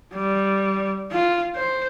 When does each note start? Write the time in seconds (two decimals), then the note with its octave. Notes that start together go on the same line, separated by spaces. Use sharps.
0.13 G3
1.12 F4
1.55 C5